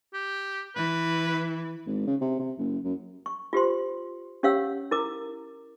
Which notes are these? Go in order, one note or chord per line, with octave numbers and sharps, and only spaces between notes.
G4
E3 B4
G#1
C#3
C3
C3
F#1
F#2
C#6
F4 G4 C5 C6
C#4 G4 C#5 F5 F#5 E6
E4 A#4 A#5 D6